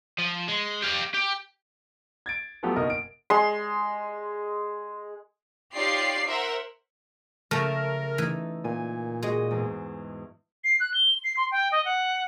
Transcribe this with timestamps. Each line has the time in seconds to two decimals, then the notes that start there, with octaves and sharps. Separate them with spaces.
0.18 F3
0.48 G#3
0.82 G4 F5
1.14 G4
2.26 G#6 A6 D7
2.63 F3 F#3 A3 B3 G4
2.76 F#1 B2 D#4 A#4 D#5
2.90 D7
3.30 G#3 C6
5.74 D#4 F4 G4 C#5 D5 C7
6.27 A#4 C5 E5 F#5
7.51 C#3 F3 A3 A#4 A5 E6
8.18 E3 A3 D#4
8.64 A#2 G#5
9.23 G#3 F#4 D#5
9.51 E2 G#2
10.64 C7
10.80 F#6
10.94 G7
11.24 C7
11.37 C6
11.51 G5
11.72 D#5
11.85 F#5